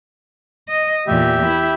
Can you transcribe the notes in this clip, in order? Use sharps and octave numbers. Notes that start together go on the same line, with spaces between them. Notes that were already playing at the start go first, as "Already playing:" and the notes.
D#5
E2 A#2 G4 E5
E4